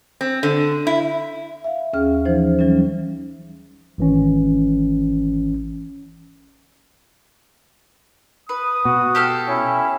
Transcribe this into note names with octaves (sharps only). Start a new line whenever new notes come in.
C4
D3
E4
E5 F5
D#2 C#4 G#4 F6
E3 F3 D#4 C5
E3 F#3 G3 C#4
G#1 E3 C#4
B4 D#6
B2 F#4
G4 A4 F5
C#4 E4